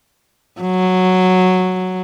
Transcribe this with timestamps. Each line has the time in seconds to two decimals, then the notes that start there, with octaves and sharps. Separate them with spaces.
0.61 F#3